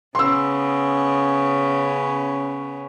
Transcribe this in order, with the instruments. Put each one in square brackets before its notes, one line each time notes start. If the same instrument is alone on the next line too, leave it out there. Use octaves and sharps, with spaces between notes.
[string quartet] C#3 B3 C#4 [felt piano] C6 E6